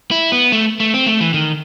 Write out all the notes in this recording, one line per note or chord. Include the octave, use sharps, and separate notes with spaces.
E4
B3
A3
A3
C4
A3
E3
D#3